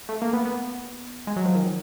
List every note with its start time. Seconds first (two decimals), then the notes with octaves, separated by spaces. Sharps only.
0.09 A3
0.22 A#3
0.33 B3
0.45 B3
1.27 G#3
1.36 F#3
1.45 F3
1.55 D#3